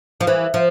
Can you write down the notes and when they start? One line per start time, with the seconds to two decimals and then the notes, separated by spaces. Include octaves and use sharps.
0.21 F3
0.27 E3
0.54 F3